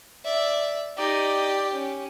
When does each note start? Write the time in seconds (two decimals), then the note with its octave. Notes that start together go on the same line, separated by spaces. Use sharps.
0.25 D5 E5
0.98 D#4 G4 D5 D#5
1.72 C#4